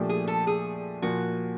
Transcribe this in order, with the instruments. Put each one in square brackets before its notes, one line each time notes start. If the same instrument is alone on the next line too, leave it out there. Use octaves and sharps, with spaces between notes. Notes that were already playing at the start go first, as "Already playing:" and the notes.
Already playing: [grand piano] A#2 F3 A3 D4 G4
[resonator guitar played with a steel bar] G#4
A4
G#4
[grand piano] A#2 F3 A#3 [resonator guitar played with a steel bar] F#4